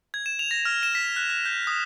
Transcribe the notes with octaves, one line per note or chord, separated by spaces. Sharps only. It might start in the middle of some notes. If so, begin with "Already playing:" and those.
G#6
E7
F7
A#6
F6
E7
B6
F#6
F#6
G6
D#6